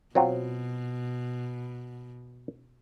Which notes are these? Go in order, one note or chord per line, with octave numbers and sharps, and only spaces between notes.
B2 F#3 C4 F4